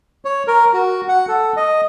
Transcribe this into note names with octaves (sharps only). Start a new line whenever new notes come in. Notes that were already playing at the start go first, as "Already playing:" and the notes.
C#5
A#4
F#4
F#5
A4
D#5